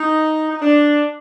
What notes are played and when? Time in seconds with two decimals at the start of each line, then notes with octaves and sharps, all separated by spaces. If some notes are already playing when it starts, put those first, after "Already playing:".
Already playing: D#4
0.50 D#4
0.61 D4